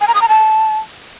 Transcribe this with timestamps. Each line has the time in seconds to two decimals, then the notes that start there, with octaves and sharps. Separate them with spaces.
0.01 G#5
0.08 A#5
0.15 D#6
0.22 A#5
0.29 A5